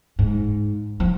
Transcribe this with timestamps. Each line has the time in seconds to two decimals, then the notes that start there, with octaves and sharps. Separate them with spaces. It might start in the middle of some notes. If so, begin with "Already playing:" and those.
0.19 G#2
1.00 F3